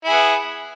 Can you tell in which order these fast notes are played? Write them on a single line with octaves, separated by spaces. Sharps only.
E4 G#4 B3